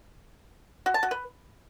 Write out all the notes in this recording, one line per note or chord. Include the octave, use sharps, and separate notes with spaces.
F#4
A5
F#4
B4